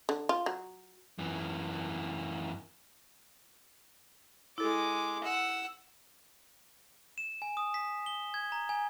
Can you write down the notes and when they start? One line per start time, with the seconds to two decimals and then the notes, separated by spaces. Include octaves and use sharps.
0.09 D3
0.29 F4
0.46 F#3
1.18 F#2 E3
4.58 G#3 E4 A4 D6
5.24 F#5 E6
7.18 E7
7.42 G#5
7.57 D#6
7.74 B6
8.06 G7
8.34 G#6
8.52 A#5
8.69 G#5